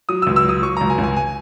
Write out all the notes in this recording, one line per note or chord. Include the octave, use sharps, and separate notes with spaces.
F#3 D#6
C#2 E6
E6
F#3 D#6
F#3 C#6
C#2 A#5
G#5
C#2
G#5
G#5